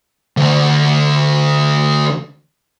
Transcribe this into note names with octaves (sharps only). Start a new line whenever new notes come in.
D2 D3